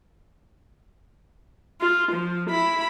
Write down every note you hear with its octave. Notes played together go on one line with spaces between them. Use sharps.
F4
F3
E4 B5